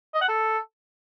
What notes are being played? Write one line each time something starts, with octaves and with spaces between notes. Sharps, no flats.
D#5
F#5
A4